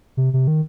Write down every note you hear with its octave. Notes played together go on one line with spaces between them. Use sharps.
C3
C3
D#3